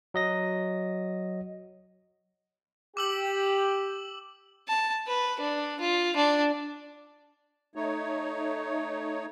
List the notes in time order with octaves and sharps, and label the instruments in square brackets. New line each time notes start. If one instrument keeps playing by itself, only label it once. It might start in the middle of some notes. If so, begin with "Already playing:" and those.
[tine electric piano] F#3 D#5 A#6
[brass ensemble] G4 [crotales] D6 E6 F#7
[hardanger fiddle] A5
B4
D4
F4
D4
[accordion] A3 D#4 C#5